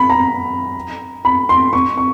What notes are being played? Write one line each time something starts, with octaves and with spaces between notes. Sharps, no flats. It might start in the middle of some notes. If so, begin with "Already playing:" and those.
Already playing: B5
A#5
B5
C6
C#6
C#6